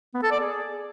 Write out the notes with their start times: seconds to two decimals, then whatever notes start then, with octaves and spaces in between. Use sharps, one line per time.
0.14 B3
0.23 A4
0.32 D5
0.40 G#4